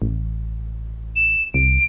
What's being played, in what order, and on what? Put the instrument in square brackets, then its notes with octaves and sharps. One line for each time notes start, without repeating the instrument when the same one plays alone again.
[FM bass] A1
[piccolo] E7
[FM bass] C2 [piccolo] D7